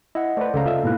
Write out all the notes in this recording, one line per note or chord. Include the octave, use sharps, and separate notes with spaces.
E4 D#5 F#5
A3 B4 C5 D5
C#2 C#3 A4 F5 A#5
F4 D#5 E5
G#2 B2 A#3 E4 F#6